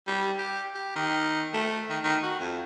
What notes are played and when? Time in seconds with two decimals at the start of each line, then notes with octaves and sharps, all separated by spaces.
0.08 G3
0.38 G4
0.75 G4
0.96 D#3
1.54 A3
1.90 D#3
2.04 D#3
2.23 F#4
2.40 F2